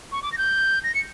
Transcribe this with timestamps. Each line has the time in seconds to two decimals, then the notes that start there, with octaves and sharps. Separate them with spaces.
0.12 C#6
0.22 D6
0.32 A#6
0.38 G6
0.84 A#6
0.94 C#7